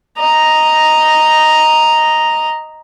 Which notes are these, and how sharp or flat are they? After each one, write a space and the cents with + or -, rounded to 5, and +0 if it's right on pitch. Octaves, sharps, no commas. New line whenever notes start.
D#5 +0 A#5 +0